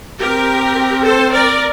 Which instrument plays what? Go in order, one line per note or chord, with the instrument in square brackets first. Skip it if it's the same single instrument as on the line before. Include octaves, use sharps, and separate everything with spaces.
[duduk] C4 [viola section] G4 A#4
[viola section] A4 C5
A#4 D5